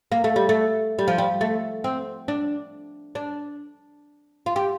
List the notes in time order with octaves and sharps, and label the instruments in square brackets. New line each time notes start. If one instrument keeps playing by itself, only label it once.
[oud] A#3
A3
G3
A3
G3
F3
G3
A3
C4
D4
D4
F4
G4